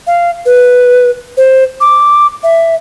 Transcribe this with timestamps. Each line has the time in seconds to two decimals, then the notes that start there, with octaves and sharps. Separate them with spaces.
0.07 F5
0.46 B4
1.37 C5
1.81 D6
2.43 E5